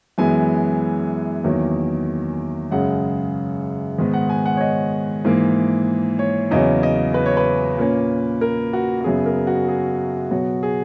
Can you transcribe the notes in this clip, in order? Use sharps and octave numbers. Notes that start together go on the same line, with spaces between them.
F#2 E3 G#3 B3 G#5
E2 D#3 F#3 A#3
F#2 C#3 G#3 F#5
G#2 D#3 G#3 B3
F#5
G#5
F#5
C#5
D#5
G#2 E3 A#3
C#5
E2 C#3 F#3 C#4 D#5
D#5
B4
C#5
B4
A#2 A#3 C#4
A#4
F#4
F#4
F#2 C#3 F#3 B3 G#4
A#4
F#4
G#4
B2 F#3 B3 F#4
G#4